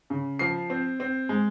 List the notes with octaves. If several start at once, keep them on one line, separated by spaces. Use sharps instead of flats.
C#3
F3 C7
C4
C4
G#3